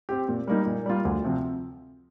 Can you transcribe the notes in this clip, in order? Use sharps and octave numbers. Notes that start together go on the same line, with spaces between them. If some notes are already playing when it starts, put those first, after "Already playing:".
C4 G4
A#2
G3 A#3 D#4
A#2
G3 A#3 F4
D2
C3 F3 C4